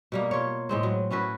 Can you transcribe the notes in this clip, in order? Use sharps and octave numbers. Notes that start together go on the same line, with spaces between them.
B2 G3 A#3
F4 C#5
A2 G#3 C4
F#3
C#4 E4 F#4 B4